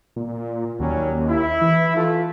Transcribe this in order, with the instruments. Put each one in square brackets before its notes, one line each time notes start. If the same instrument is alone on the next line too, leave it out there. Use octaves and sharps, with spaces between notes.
[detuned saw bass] A#2
[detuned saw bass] D#2 [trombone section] F#3 G3 C#4
[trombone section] E4
[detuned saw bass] E3
[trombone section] A3 F4